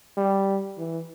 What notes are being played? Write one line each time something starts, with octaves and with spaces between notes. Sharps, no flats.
G3
E3